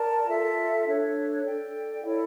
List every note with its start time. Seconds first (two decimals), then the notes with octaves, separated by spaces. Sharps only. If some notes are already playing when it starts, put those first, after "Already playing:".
Already playing: A#4 D5 A5
0.26 F4 A4 E5
0.85 D4 A4 C#5
1.43 A4 D5 G5
2.02 E4 A4 C#5